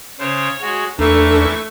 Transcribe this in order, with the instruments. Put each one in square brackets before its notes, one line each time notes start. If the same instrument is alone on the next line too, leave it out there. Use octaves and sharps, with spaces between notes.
[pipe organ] C#3 C5 [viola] C#5
[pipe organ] G#3 F#4
[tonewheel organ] E2 D4 A4 [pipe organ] E3 A#3 [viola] A3 C#6